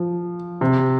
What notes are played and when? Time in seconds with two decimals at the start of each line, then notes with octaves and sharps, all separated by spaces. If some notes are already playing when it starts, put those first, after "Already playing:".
Already playing: F3
0.61 C3